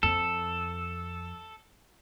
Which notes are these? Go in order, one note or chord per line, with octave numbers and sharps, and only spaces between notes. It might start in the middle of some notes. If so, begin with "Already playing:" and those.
F2 A4